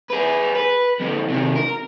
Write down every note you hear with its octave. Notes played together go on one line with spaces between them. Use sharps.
G#4 B4
B4
F2 D3
C3 D#3
A#4